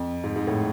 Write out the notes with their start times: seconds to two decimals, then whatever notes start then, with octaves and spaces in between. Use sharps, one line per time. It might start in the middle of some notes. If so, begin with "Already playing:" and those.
Already playing: F2
0.24 G#2
0.36 G#2
0.47 A2